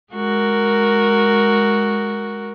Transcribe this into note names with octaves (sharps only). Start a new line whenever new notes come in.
G#3 F#4 A#4